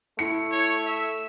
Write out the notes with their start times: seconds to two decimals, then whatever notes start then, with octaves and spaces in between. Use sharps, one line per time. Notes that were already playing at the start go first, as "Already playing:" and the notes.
0.19 A3 E4 C#7
0.52 C#5
0.86 E5